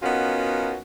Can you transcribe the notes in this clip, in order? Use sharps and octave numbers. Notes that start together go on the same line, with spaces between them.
B3 C#4 D#4 F4 F#4 A#4